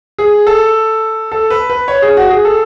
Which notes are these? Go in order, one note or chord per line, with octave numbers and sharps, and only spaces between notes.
G#4
A4
A4
B4
B4
C#5
G#4
F#4
G#4
A4